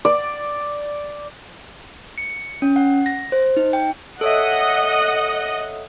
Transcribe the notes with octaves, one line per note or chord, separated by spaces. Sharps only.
D5
C#7
C#4
F#5
A#6
C5
D#4
G5
A4 C#5 D#5 E5 F#5